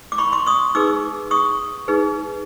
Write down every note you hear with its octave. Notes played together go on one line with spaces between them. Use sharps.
D6
B5 C#6
C6 D6
C#6 D#6
D#4 G#4 B4 D6 E6
C#6 D#6
D#4 G#4 B4